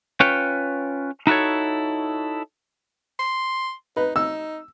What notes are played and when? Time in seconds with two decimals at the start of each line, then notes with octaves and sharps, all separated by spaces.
0.20 C#4 F4 B4 C#5 G5
1.27 D#4 E4 F#4 A4 C#5
3.19 C6
3.97 D#4 B4
4.16 D#4 E6